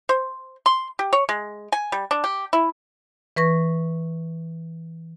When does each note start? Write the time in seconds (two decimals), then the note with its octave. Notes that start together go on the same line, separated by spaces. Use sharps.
0.09 C5
0.66 C6
0.99 G4
1.13 C#5
1.29 G#3
1.72 G#5
1.92 G3
2.11 D4
2.24 G4
2.53 E4
3.36 E3 B4 C#6 A#6